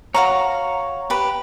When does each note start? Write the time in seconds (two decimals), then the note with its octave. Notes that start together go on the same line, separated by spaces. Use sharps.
0.15 F#4 C#5 F5 A#5
1.10 G4 B4